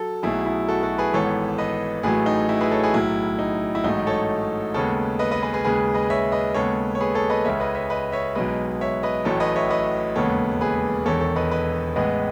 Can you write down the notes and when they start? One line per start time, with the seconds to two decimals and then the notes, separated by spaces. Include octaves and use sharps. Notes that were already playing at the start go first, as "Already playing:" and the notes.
Already playing: F#3 A4
0.23 B1 B2 F#3 A3 E4 G#4
0.46 E4
0.68 F#4 A4
0.83 F#4 A4
0.98 G#4 B4
1.14 G#1 G#2 E3 B3 A4 C#5
1.58 B4 D#5
2.03 A1 A2 F#3 A3 G#4 B4
2.26 D#4
2.49 E4
2.61 G#4 B4
2.71 A4 C#5
2.83 G#4 B4
2.94 B1 A2 F#3 E4
3.39 D#4
3.75 E4
3.84 A1 G#2 F#3 A3 D#4
4.07 A4 C#5
4.74 D#2 C#3 G#3 B3 A4 C#5
5.19 B4 D#5
5.31 B4 D#5
5.42 G#4 B4
5.54 G#4 B4
5.64 D#2 C#3 G#3 G#4 B4
5.95 B4 D#5
6.10 C#5 E5
6.32 B4 D#5
6.54 D#2 C#3 G#3 B3 A4 C#5
6.95 C#5
7.00 G#4 B4
7.15 A4 C#5
7.30 B4 D#5
7.45 C#2 C#3 G#3 C#5 E5
7.60 B4 D#5
7.75 C#5 E5
7.90 B4 D#5
8.12 C#5 E5
8.35 B1 B2 G#3 B4 D#5
8.81 C#5 E5
9.03 B4 D#5
9.25 A1 A2 F#3 A3 A4 C#5
9.40 B4 D#5
9.56 C#5 E5
9.70 B4 D#5
10.16 E1 D#2 C#3 G#3 B3 A4 C#5
10.61 G#4 B4
11.06 E1 E2 D#3 A4 C#5
11.21 A4 C#5
11.36 B4 D#5
11.51 B4 D#5
11.96 A1 A2 G#3 B3 B4 D#5